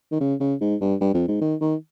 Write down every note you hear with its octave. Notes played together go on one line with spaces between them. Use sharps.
D#3
C#3
C#3
G#2
G2
G2
F2
G#2
D#3
D#3